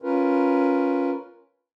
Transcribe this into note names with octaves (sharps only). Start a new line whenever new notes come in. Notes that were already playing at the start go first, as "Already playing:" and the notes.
C#4 F4 A#4 B4